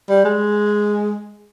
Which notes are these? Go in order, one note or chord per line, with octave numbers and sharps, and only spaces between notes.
G3
G#3